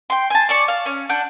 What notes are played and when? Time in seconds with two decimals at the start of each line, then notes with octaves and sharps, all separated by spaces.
0.10 G5 C6
0.30 G#5 A5
0.49 C#5 D5 A5
0.68 F5
0.86 C#4
1.09 D4 F#5 G6